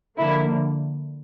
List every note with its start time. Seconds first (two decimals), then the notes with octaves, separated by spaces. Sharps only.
0.18 D3 F3 A#3 E4